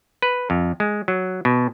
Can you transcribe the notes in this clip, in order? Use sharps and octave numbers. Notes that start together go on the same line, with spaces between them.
B4
F2
G#3
F#3
B2